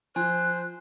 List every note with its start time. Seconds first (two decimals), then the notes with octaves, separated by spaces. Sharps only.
0.16 F3 C5 G#5 F#6